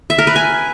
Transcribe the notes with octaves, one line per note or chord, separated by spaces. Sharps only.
E5
A#4
B4
G#5